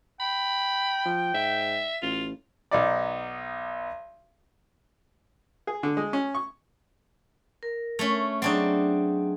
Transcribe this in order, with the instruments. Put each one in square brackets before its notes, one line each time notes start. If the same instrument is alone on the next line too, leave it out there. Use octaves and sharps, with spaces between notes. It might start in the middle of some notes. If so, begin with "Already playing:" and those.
[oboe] G5 [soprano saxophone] B5
[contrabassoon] F3
[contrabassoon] G#2 [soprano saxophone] E5
[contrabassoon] A1 [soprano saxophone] F4
[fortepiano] B1 D#4 D5
G#4
D3
G#3
C#4
C#6
[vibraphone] A#4
[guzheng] A3 C#4
[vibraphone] F#3 G#4 [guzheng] C4 D4 D#4